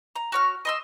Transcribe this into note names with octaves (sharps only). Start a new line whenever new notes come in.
A#5
F#4 C#5 F6
D#5 C6 E6